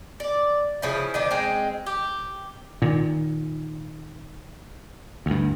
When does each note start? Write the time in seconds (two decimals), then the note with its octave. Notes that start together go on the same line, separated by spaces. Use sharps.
0.20 D5
0.82 C#3 F3 E4
1.14 D#3 F3 D4
1.31 G#3 C4
1.86 G4
2.82 A#2 D#3
5.26 D2 G2